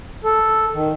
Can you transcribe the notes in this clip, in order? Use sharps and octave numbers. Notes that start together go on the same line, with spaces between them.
A4
D#3